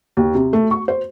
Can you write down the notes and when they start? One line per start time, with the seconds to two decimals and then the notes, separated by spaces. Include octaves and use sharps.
0.17 D#2
0.35 C3
0.53 A3
0.71 C#6
0.88 C5